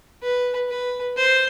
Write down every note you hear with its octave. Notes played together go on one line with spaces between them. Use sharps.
B4
B4
C5